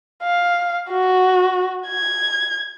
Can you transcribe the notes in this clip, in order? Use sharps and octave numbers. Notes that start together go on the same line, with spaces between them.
F5
F#4
G#6